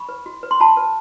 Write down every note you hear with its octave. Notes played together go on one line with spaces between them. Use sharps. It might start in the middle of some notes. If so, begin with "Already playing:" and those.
Already playing: B5 C#6
B4
F#4
B4
C6
F#4 A5 B5
B4